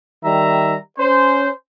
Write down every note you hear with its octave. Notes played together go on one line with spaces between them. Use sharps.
D#3 G3 E5 A#5
C#4 C5